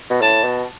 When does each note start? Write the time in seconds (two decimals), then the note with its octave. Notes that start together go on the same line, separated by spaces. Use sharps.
0.10 B2
0.22 A2 A5
0.44 B2